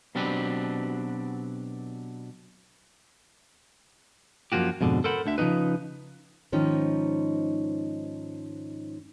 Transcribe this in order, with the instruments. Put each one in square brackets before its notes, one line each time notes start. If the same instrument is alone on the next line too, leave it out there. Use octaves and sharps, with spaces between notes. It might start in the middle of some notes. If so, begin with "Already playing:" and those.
[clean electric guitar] B2 F#3 C4 D4 G4 B4
F#2 F3 A#3 F#4 G4
F2 G#2 B2 D3
A4 A#4 C5 F#5 B5
D2 D3 E5
C#3 F3 C#4 D#4 B4
[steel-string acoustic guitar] G#2 D#3 F3 C#4 D#4